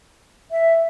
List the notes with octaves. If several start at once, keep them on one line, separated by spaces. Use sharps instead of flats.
E5